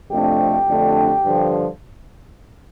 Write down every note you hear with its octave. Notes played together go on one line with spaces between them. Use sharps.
F2 C3 A3 D4 G4
F2 D3 A3 D4
G2 D3 F3